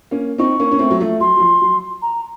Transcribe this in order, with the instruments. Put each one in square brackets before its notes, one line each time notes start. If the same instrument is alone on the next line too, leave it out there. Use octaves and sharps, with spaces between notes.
[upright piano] A#3 C#4
[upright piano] C4 D#4 [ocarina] C#6
[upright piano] A#3 C#4
C#4
A3 C4
F#3
F3 A3
[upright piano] F#3 [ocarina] C6
[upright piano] F#3
F3
F#3
[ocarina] A#5